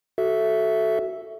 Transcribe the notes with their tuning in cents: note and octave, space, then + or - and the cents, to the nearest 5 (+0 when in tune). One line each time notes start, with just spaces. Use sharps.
F#4 +15 A4 -5 E5 +0